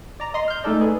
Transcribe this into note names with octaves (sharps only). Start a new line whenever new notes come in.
D5 A#5
D#5 C6
F6 G6
A3 D#4 G#4 A4 D5
G#4 B4